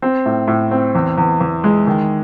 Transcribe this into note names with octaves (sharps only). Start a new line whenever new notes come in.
C4
A2
A2
C4
E2
E2
E2
G#3
D#3